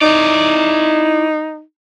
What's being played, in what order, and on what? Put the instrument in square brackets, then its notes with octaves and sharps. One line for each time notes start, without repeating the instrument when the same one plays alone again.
[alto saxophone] D#4 [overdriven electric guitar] E4 D5